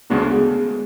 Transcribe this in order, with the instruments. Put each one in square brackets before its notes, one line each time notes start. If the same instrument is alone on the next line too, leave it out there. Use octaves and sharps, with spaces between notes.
[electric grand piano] D2 C#3 G#3 D4 F#4 [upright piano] B3
[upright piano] A3
G#3